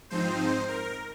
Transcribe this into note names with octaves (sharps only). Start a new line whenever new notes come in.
G#2 F3 C4 D#4 C5
A#4